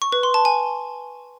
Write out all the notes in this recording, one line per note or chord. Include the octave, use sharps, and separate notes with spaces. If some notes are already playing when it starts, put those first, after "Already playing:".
C#6
B4
C6
A5
G#5